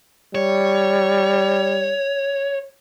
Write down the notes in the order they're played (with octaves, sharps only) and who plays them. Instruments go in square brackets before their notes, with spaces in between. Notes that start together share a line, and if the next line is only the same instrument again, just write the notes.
[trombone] G3 [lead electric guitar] C#5